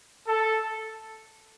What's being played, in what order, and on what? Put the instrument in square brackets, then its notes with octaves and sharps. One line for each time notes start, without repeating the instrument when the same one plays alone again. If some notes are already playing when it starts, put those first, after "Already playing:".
[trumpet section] A4